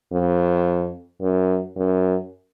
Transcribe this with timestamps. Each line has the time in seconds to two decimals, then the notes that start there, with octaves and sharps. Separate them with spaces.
0.13 F2
1.21 F#2
1.77 F#2